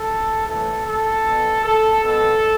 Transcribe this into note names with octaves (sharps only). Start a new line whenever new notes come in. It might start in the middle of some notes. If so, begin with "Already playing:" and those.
Already playing: A4
A2 E3 A4
A4
B2
A4
B2 A4